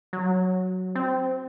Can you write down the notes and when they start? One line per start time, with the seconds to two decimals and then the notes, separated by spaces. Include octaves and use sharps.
0.13 F#3
0.95 C4